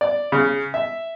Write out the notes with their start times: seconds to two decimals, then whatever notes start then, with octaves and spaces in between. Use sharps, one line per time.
0.01 D5
0.32 C#3
0.74 E5